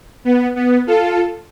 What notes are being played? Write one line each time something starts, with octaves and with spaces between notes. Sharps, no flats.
B3
B3
F4 A4